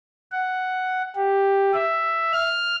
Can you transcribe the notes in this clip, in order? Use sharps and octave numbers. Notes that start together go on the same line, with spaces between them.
F#5
G4
E5
F6